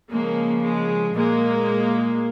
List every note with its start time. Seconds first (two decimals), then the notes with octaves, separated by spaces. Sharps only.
0.10 C#3 F3 G#3 A#3
0.62 G#3
1.15 A#2 G#3 A#3